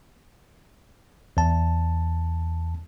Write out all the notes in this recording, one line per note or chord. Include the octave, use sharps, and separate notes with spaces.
E2 A5